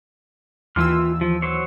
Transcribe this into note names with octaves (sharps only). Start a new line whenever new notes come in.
D#2 E3 F4 C6 E6 F6
F3
F#3 C5 C#5